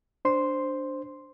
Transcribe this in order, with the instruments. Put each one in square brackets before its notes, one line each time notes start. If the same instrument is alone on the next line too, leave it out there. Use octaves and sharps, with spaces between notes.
[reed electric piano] D4 C5 C6